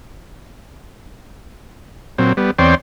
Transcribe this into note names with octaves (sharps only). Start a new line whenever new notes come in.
A#2 F#3 C4
G3 B3
E2 C4 C#5 D5 G5 C6